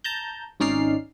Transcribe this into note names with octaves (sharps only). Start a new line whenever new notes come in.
A5 A#5 G6
G#1 C#4 D#4 D5 F6 C7